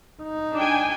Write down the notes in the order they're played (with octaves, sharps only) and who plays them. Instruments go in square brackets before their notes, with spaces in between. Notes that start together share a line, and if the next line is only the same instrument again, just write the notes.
[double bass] D#4
[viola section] D4 G5 G#5